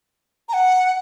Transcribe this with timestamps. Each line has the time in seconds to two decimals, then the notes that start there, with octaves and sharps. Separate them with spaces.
0.49 A#5
0.53 F#5